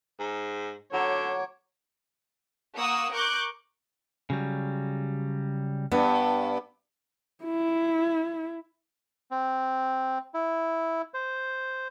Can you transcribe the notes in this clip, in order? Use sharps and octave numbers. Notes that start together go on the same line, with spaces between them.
G#2
D3 F#3 C#5 D6 D#6
A#3 F#5 C#6 D#6 E6
A#4 C#6 D6 F#6 G6
C#3 F#3 G3
G2 B3
E4
C4
E4
C5